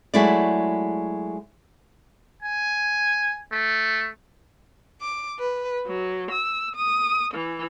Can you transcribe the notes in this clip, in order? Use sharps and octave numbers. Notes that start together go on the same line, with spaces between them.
F#3 G#3 A3 E4 F#4 D5
G#5
A3
D6
B4
F#3
E6
D#6
E3